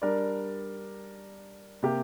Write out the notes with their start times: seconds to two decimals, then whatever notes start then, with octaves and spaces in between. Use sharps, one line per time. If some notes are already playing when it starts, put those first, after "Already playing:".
0.02 G3 D4 A#4 D5
1.82 C3 A#3 G4